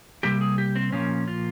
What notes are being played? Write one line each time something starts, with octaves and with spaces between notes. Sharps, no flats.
C3 G3 A#3 G4
G#4
G4
C4
A#2 F3 A#3 C#4
F4